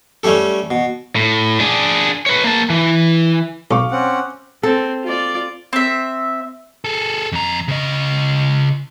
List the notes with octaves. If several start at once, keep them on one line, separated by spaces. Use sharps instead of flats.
G3 A3 C#4 G4 A4
B2
A2
D4 G#4
B4 C#5
A#3 A5
E3
B1 F5 C#6 D6
C4 C#4 F#5
C4 A4
F4 D5
C4 E5
G#4 A4
F2 A#5
C#3 D#5